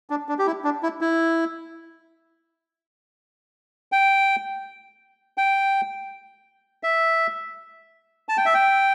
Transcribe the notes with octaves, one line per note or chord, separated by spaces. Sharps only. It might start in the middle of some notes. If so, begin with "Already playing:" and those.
D4
D4
G4
E4
D4
E4
E4
G5
G5
E5
A5
G5
E5
G5